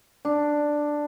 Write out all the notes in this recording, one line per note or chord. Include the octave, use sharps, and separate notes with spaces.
D4